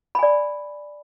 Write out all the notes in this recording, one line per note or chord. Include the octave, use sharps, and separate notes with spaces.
D5 G#5 B5